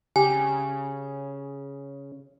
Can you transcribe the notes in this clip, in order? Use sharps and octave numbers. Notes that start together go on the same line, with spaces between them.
C#3 G4 G#5